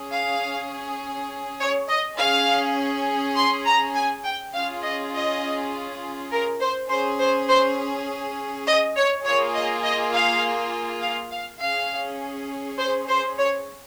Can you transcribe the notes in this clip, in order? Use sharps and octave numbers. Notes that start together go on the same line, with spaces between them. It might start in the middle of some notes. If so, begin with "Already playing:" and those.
Already playing: C#4 G#4
F5
C#5
D#5
C#4 G#4 F5
C6
A#5
G#5
G5
C#4 F4 G#4 F5
D#5
D#5
A#4
C5
C#4 G#4 C5
C5
C5
D#5
C#5
A#3 F4 G#4 C#5
D#5
D#5
F5
F5
F5
C#4 G#4 F5
C5
C5
C#5